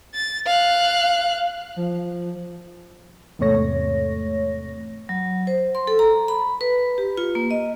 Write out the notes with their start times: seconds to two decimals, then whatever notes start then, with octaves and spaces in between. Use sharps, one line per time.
0.14 A6
0.46 F5 F#6
1.76 F3
3.39 E2 G#2 C3 A3 C#5 A#6
5.09 F#3
5.47 C5
5.75 C6
5.87 A4
5.99 A#5
6.28 B5
6.61 B4
6.98 G4
7.17 F4
7.35 A#3
7.51 D#5